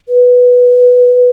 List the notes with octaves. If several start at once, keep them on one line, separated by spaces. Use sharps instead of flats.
B4